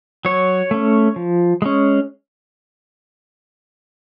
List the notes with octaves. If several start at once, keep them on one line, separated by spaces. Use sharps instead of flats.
F#3 C#5
A3 C#4
F3
G#3 C#4